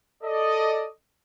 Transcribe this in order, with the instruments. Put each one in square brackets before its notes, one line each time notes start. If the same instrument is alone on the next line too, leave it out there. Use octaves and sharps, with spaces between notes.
[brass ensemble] A4 D5 D#5